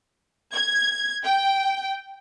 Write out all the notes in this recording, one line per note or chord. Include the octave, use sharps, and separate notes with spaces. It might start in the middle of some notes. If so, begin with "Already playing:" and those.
G#6
G5